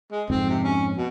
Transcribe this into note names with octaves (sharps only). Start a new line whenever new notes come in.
G#3
F2 G#2 C4
C3
C#4
B2